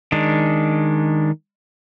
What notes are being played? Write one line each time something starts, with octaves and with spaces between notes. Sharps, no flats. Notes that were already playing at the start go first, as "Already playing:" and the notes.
D#3 G#3 D4